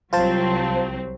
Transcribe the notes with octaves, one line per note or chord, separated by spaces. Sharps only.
C2 F#3 C4 F4 C5 A5